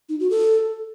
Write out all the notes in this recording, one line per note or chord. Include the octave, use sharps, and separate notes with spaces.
D#4
F#4
A4